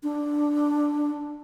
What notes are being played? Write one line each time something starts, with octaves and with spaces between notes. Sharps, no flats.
D4